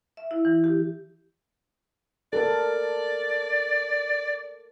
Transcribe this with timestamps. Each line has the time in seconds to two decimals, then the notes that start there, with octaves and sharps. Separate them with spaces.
0.17 E5
0.31 E4
0.45 E3
0.64 G4
2.33 A4 A#4 D5